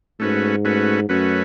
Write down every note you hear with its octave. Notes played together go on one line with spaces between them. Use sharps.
G#2 A3 C#4 F#4 B4
A3 C#4 F#4 B4
F#2 A3 C#4 F#4 B4